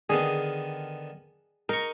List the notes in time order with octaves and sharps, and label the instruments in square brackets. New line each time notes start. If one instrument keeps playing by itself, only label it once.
[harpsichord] D3 D#3 B3 [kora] G#4
[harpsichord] D#4 C#6 [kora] A#4